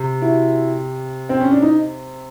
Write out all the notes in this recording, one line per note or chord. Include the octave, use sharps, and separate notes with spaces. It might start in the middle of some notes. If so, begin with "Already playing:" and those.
Already playing: C3
E4 F#4
C4
C#4
D4
D#4